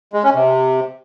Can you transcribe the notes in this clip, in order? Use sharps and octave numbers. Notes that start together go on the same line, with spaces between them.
G#3
C#4
C3